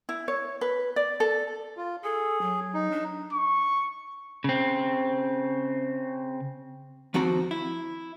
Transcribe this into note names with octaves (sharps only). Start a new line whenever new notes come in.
E4
C#5
B4
D5
A4
F4
G#4 A4
F#3
D#4
D4
C#6
C#3 C4
D#2 F3 C4 F#4 A#5
E4